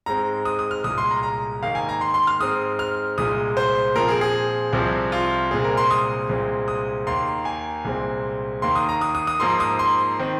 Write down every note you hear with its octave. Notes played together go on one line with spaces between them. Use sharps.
G#2 G#3 C4 A#5
D#6
D#6
F6
C2 A#2 G#3 D#6
C6
A#5
A#5
G#2 D#3 A#3 F5
G#5
A#5
C6
C6
F6
G#2 G#3 C4 D#6
F6
C2 A#2 G#3 D#6
C5
A#2 F3 C4 A#4
G#4
G#4
C2 C3 F3 C4
F4
C2 A#2 G#3 C4 G#4
A#4
C6
D#6
C2 A#2 G#3 C4
D#6
D#2 D#3 A#3 C6
G#5
C2 A#2 G#3 C4
D#2 D#3 A#3 C6
D#6
A#5
D#6
D#6
D#6
G#2 F3 A#3 C6
D#6
C6
D#3 C4